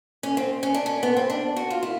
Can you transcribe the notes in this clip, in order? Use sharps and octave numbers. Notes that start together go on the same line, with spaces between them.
C#4
C4
C#4
D4
C#4
B3
C4
D4
F#4
F4
E4